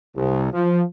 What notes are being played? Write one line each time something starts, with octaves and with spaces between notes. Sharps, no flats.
C2
F3